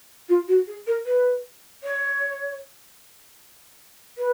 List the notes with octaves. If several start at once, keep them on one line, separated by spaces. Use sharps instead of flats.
F4
F#4
G#4
A#4
B4
C#5
B4